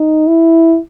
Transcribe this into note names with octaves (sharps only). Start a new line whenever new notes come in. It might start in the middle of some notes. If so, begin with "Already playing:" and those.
Already playing: D#4
E4